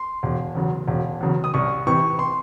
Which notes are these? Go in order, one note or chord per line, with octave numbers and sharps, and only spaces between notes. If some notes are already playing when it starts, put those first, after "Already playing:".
Already playing: C6
E1
E2 C#3 F#3
E1
E2 C#3 F#3
D#6
C2 C#6
C3 E3 C#6
C6